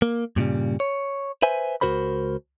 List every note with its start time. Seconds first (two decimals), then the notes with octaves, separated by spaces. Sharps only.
0.02 A#3
0.36 G2 A#2 C#3 G3
0.80 C#5
1.42 B4 C5 E5 G#5
1.81 C#2 D3 F#4 A#4 C5 B5